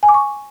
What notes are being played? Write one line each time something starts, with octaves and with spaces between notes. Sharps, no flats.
G#5
D6
C#6